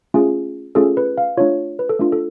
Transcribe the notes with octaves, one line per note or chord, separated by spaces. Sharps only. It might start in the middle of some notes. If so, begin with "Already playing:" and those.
A3 C#4 F4 G#4
A3 C#4 F4 G#4 A4
B4
F5
A3 D4 F4 C#5
B4
A4
A3 D4 F4
A4